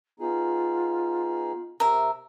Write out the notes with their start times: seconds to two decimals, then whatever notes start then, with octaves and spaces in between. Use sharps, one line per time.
0.20 B3 D#4 F4 G#4
1.80 C3 A#4 E5